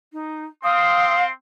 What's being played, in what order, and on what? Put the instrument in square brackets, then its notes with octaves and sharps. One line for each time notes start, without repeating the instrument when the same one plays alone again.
[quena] D#4
[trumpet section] C4 C6 [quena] F5 [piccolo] D#6